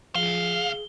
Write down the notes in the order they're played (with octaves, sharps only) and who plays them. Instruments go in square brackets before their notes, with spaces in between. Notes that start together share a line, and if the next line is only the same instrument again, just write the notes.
[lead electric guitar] D2 F5 [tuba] F3 [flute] G#4 [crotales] G7